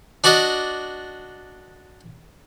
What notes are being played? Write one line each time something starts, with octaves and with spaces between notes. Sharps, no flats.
D4 F#4 D5 D#5